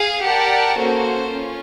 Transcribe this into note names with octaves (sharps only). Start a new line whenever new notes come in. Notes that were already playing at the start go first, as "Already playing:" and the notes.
Already playing: G#4 F5
G4 A#4 D5 F#5 A5
A#3 C#4 F#4 A4 C5
C#4 F4